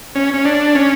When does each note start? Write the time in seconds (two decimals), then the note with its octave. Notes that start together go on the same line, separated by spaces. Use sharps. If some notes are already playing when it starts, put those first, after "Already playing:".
0.15 C#4
0.34 C#4
0.45 D4
0.75 C#4